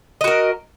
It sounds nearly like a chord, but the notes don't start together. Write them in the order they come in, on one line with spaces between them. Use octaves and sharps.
D#5 F#4 A#4